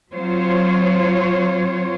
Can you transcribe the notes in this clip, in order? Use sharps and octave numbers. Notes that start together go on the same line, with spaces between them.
F#3 C4 F4 C5 C#5